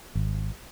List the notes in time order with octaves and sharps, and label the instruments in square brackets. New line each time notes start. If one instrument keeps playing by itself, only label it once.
[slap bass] G#1